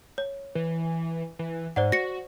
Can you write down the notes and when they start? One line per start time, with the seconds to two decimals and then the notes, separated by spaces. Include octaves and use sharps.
0.18 C#5
0.55 E3
1.39 E3
1.76 G#2 C5 D5 F#5
1.92 F#4 A#6 C#7